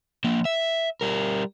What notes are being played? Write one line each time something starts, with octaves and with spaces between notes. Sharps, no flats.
F3 A#3
E5
G3 A#4